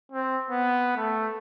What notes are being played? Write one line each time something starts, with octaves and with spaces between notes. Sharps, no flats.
C4
B3
A3